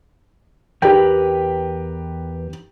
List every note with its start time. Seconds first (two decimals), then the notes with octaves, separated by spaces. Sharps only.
0.82 E2 G4 A#4 B4 G5